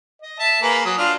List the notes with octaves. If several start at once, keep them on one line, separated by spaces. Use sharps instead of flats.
D#5
E5 A5
A#3 G#4 B4
F#3 D#6
D4 F4 F6